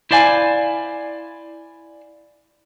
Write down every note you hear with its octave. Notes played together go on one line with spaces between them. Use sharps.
E4 C5 D5 F5 G#5